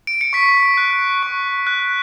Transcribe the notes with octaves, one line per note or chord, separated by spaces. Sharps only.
D7
C#7
C#6 B6
F#6
C#6
F#6